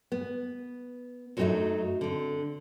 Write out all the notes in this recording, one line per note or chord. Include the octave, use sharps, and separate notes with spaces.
B3
F#2 F#3 A3 B3 D#4 F#4
D3 C4